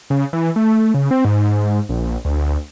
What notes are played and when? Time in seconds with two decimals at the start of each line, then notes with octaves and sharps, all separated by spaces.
0.10 C#3
0.33 E3
0.56 A3
0.94 C#3
1.11 C4
1.25 G#2
1.89 A#1
2.25 D2